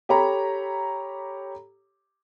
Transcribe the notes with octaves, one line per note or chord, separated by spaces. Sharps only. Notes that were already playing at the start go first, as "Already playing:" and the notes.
G4 A4 C#5 A#5 B5